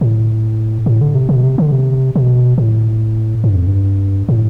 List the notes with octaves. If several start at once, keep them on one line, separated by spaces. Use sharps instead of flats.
A2
A2
D3
C3
B2
C3
D3
C3
B2
A2
G2
F2
G2
A2